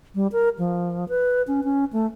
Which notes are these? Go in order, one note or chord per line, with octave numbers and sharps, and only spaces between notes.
G3
A#4
F3
B4
C#4
C#4
A3